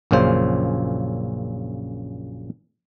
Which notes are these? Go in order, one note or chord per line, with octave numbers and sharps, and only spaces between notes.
A#1 F#2 A#2 C#3 C5